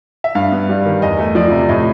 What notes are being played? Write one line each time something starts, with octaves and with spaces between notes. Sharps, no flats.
E5
G2 F5
B3
G3
D#3
E2 D#5
A3
F3 D5
C3
A2 D#5